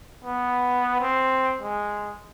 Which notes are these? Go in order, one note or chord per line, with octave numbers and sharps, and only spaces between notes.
B3
C4
G#3